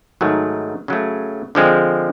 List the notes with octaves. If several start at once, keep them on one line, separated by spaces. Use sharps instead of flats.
G#2 D#3 F#3 A3
C#3 F#3 A3
D3 F3 G#3 C4